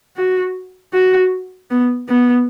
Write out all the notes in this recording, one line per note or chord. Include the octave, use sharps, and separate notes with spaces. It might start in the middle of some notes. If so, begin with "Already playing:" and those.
F#4
F#4
B3
B3